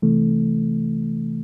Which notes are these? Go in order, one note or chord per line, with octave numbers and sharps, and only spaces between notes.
C3 E3 A3